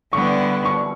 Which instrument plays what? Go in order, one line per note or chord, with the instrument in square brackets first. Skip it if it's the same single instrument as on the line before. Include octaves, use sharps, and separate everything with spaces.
[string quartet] D3 G3 B3 E4 [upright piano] C#6
[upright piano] C#6